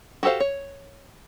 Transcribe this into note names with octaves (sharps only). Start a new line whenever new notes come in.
F#4 G4 A4 C5 F5
C#5